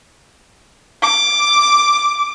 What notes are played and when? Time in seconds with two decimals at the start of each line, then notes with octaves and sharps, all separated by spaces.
1.02 D6